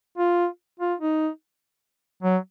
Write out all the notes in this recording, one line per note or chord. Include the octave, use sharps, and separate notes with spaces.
F4
F4
D#4
F#3